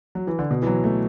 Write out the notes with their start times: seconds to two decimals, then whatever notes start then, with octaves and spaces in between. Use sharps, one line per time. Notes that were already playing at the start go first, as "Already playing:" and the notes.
0.15 F#3
0.27 E3
0.39 D3
0.51 B2
0.62 E3
0.67 F#3
0.84 A3